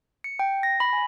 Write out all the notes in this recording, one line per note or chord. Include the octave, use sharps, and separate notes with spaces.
C#7
G5
A#6
B5
G#5